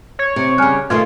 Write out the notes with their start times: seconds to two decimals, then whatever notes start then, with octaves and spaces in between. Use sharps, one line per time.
0.19 C#5
0.36 C3
0.58 C#3 G3 G#5 F6 F#6
0.90 B2 D#3 A3 F4 G#6